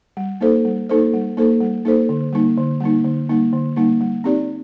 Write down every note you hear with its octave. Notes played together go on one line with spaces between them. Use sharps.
G3
A#3 D#4 A4 C5
G3
A#3 D#4 A4 C5
G3
A#3 D#4 A4 C5
G3
A#3 D#4 A4 C5
D3
G3 A#3 D#4
D3
G3 A#3 D#4
D3
G3 A#3 D#4
D3
G3 A#3 D#4
G3
C4 D#4 G4 D5